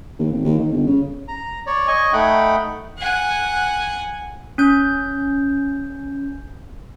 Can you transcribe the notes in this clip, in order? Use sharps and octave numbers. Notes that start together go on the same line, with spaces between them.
D#2
G#1
D#2
D#3
G1
C#3
A#5
C#5 D5
D#5 G#5 C#6
A3 D#4 F#5 G5 B5
F#5 G#5
C#4 G6